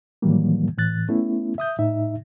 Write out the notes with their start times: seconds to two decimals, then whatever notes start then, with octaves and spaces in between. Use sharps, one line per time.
0.22 A2 D#3 E3 F#3 G3 A#3
0.78 A2 E3 F#6 A6
1.09 A3 B3 C#4 E4
1.58 E5 D#6 G6
1.79 A2 D#4 E5